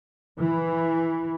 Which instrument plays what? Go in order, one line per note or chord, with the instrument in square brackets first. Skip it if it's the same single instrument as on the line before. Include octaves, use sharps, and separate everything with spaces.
[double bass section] E3